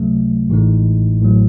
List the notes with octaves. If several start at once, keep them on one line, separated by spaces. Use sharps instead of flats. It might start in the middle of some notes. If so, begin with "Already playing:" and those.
Already playing: C#2 C3 F#3 A3
A1 A2 E3 G#3 D#4
A1 A2 F#3